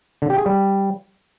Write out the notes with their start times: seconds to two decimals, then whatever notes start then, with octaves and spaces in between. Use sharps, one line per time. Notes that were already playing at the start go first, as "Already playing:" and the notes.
0.22 D3
0.30 G4
0.38 G#4
0.46 G3